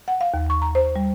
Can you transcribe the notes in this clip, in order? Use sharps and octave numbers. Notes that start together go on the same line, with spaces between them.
F#5
F5
D#2
C#6
A#5
C5
G3